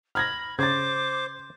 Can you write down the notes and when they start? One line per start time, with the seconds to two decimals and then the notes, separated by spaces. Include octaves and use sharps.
0.15 B5 F6 G#6 A#6
0.59 C#3 C5 D6 G#6 A6